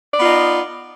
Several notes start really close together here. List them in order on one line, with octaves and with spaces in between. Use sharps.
D5 B3 F4 D#4